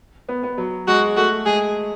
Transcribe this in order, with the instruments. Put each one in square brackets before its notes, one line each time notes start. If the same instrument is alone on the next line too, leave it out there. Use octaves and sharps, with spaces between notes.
[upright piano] B3
B3
F#3
[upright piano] G#3 [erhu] F#4
[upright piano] A3 [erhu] F#4
[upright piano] G#3 [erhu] G#4